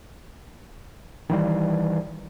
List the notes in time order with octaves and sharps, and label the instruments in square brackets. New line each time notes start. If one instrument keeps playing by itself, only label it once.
[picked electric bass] D#3 E3 G3